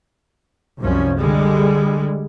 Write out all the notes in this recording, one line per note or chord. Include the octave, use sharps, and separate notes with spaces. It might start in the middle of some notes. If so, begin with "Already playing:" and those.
C2 F#2 F3 C#4
D3 G3 G#3